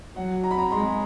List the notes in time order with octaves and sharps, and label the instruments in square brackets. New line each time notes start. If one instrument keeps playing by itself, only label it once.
[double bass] F#3 [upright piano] F#5
[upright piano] A#5
B5
A#5
[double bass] G#3 [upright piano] C6